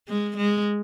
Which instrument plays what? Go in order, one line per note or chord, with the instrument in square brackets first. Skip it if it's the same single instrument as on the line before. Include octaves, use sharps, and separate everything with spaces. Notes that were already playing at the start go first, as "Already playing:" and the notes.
[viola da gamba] G#3
G#3